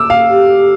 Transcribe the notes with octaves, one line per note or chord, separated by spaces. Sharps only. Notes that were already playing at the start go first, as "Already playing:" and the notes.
Already playing: D6 E6
F5
G4